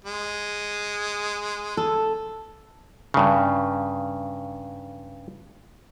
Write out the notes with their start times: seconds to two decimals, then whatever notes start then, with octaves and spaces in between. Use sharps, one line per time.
0.05 G#3
1.77 A4
3.14 G2 C#3